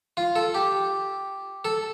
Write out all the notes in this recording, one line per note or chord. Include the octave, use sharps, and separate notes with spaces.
F4
A4
G4
A4